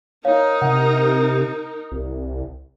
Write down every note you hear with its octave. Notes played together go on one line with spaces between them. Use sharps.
D#4 A#4 C#5 F5
C3 F#5
C2